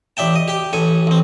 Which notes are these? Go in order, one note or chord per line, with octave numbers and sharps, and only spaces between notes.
A1 D5 E5 G5 A5
D#5
G4 G5
A1 A4 G#5
A1 C4